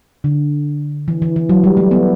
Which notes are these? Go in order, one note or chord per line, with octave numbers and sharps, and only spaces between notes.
D3
E3
E3
E3
F#3
G3
A3
B3